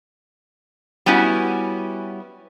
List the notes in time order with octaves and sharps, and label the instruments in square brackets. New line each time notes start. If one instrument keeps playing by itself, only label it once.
[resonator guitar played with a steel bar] G3 B3 C#4 E4 F#4